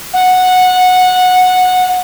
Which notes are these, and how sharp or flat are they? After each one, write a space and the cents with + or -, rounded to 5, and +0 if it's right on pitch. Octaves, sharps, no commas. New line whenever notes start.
F#5 -15